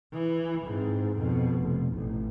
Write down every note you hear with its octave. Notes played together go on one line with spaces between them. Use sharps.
E3
G#2 C4
F2 B2
F1
A1